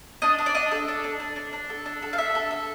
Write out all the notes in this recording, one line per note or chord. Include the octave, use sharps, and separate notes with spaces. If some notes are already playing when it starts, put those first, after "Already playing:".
D4 D#5
D4
D5
D4 D#5
A4
D4
D4
D4
D4
D4
A4
D4
A4
F5
D4 E5
A4
A4